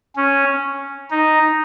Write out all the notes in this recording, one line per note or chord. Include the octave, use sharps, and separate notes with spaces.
C#4
D#4